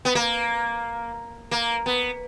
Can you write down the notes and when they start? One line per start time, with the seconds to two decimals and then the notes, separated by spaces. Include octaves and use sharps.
0.05 B3
0.15 A#3
1.51 A#3
1.86 B3